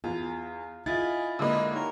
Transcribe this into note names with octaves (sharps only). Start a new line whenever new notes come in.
E2 F4
E4 F4 G#4 D#5 A6
D3 G#3 A#3 D#5 B5
D#4 G4 A#4 C#5